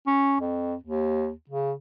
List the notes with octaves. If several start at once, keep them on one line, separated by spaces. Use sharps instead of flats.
C#4
F2
D#2
C#3